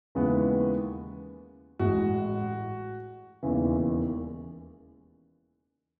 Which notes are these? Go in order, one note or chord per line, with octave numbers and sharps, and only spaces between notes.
D#2 C#3 E3 G#3 B3
A1 A2 G#3 F#4
E1 D#2 C#3 E3